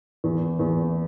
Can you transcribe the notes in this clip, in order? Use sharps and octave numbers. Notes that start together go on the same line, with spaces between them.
E2
E2